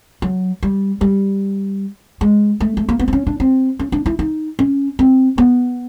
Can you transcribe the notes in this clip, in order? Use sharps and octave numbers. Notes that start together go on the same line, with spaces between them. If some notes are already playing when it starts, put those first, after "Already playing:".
F#3
G3
G3
G#3
A3
A3
A#3
B3
C4
C#4
D4
C4
C#4
D4
E4
D#4
C#4
C4
B3